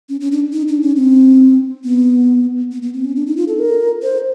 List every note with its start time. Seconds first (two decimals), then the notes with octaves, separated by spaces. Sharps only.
0.09 C#4
0.21 C#4
0.32 D4
0.53 D#4
0.68 D4
0.82 C#4
0.96 C4
1.84 B3
2.72 B3
2.82 B3
2.94 C4
3.05 C#4
3.16 D4
3.27 D#4
3.37 F4
3.48 A4
3.59 A#4
4.03 C5